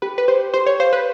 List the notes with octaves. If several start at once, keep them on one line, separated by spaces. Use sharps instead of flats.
G4 B4
B4
G4 C5
G4 C5
C#5
C5 F5
B4